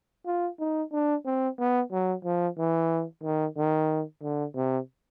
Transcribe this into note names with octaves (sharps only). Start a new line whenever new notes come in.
F4
D#4
D4
C4
B3
F#3
F3
E3
D#3
D#3
D3
C3